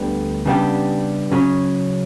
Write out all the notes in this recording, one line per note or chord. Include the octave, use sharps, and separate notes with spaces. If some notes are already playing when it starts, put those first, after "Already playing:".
Already playing: D2 D3 G3 B3
C#3 G3 B3 D4 G4
C#3 F#3 C#4